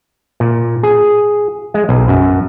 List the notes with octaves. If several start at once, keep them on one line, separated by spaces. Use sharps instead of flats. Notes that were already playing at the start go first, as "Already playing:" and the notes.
A#2
G#4
G#3
B1
F#2